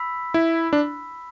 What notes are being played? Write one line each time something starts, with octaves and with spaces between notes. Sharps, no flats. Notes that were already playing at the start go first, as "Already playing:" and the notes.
Already playing: B5 E6 B6
E4
D4